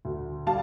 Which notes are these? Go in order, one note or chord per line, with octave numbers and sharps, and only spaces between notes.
D2
G3 F5 A5